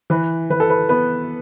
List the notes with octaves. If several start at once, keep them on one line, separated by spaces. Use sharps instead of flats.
E3 B4
E3 B4
A4
B4
B3 B4